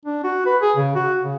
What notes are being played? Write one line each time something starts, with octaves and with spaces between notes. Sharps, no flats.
D4
F#4
B4
G#4
C#3
F#4
C#3